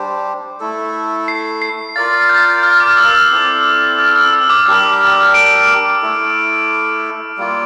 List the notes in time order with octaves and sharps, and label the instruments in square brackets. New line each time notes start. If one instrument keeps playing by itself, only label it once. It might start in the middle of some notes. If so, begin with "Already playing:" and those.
Already playing: [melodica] G3 D4 G4 C5
A3 E4 A4
[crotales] C7
C7
[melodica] F4 A#4 D5 F5 [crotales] A6
[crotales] G6
F6
D6
E6
E6
[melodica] C4 E4 A4 D5
[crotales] F6
F6
E6
E6
D6
[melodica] G3 D4 G4 A#4 [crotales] E6
[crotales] D7
[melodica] A3 E4 A4
G3 A#3 F4